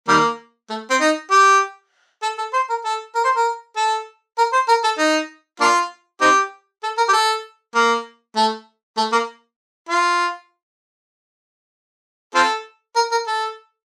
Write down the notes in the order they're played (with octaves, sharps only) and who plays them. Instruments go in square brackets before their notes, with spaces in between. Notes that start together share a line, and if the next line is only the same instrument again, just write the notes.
[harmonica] D#3 G3 A#3
A3
C4
D#4
G4
A4
A4
C5
A#4
A4
A#4
C5
A#4
A4
A#4
C5
A#4
A4
D#4
A#3 D4 F4
C4 D#4 G4
A4
A#4
G4
A4
A#3
A3
A3
A#3
F4
C4 F4 A4
A#4
A#4
A4